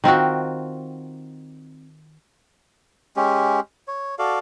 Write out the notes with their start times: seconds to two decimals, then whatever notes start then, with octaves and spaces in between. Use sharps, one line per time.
0.04 D#3 C4 F4 F#4
3.17 G#3 C#4 G4
3.88 C#5
4.19 F#4 A4 D5 F5